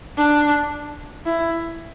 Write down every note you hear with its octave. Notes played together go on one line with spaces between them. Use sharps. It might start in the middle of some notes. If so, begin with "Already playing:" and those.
D4
E4